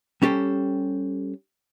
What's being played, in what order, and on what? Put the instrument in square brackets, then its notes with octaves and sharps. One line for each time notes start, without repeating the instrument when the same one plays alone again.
[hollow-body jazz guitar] G3 C#4 G4 A4 C5